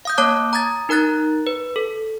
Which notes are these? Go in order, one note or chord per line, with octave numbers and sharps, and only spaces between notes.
F5 D#6 G6
A#3 C#5 A5 D6 F#6
A#5 D#6 G#6 A6
D#4 A#4 A#5 F#6 A6
B4
A4